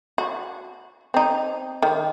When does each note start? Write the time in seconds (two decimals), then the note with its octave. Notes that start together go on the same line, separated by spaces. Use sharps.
0.18 F#4
1.14 C4 D#4
1.82 D#3